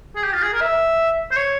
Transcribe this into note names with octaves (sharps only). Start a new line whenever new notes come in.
G#4
G4
F4
G#4
A#4
E5
C5
C#5